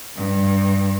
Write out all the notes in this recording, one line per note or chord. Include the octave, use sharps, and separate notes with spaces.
G2